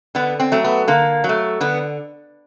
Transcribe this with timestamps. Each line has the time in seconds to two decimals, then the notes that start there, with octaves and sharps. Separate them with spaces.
0.15 D3 B3
0.40 C4
0.52 F#3 A3
0.64 B3
0.88 D3 A#3
1.24 F#3
1.29 A3
1.61 D3 B3